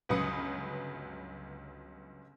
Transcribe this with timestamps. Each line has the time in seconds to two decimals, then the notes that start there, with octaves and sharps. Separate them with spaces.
0.09 G1 C#2 F#3 B4 D#6 C#7